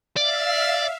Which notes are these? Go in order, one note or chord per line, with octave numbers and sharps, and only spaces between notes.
D5 E5 F5